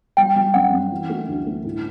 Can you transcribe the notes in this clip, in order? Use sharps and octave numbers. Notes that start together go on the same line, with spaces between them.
G3 G5
G3
F#2 F#5
F#2
E3
A3
D2
A3
A2